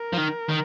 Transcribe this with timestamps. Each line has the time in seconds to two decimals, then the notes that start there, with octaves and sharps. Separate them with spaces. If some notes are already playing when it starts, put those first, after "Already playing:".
Already playing: A#4
0.13 F3
0.18 D#3
0.49 D#3